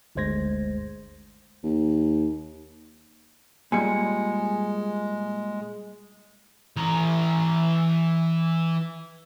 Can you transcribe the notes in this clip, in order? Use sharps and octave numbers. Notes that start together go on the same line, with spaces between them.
G1 D2 G#3 C5 G#6 A#6
D#2
A#2 G3 G#3 G#5 C#7
E3 A#5